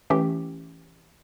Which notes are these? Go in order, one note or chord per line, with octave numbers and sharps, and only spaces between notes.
E3 A3 C#4 G4